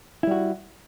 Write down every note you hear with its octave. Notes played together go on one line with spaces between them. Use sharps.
G3 E4 F#4